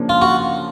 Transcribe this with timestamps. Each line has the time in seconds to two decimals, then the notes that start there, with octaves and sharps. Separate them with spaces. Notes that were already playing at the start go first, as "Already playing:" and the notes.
Already playing: C#3 F3 A#3 D4
0.09 F4
0.22 F#4